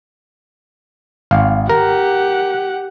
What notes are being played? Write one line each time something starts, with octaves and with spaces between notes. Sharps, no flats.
G#1 F5
G4 A#4 F#5